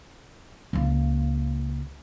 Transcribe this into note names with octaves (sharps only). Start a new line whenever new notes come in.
C#2 A#3